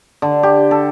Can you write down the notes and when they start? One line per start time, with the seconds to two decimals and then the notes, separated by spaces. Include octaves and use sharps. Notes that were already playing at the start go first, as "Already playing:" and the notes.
0.22 D3
0.43 G4
0.71 A4